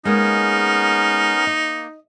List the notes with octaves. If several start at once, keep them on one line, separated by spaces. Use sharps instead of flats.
G#3 A#3 B3 C#4 D#4 A#4
A#3 D#5